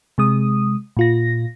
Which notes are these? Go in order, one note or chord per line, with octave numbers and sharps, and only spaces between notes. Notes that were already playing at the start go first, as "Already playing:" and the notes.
C3 G#3 D#6
A#2 F4 A#6